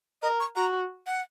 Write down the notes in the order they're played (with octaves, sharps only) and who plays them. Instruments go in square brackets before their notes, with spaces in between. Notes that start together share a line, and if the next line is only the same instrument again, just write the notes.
[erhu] A#4 [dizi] D#5
[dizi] C#6
[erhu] F#4 [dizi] A#5
[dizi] F#5